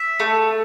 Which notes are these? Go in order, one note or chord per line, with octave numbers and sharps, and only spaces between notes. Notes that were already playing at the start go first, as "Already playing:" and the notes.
Already playing: E5
A3